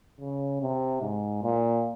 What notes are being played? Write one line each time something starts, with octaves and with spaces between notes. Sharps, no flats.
C#3
C3
G#2
A#2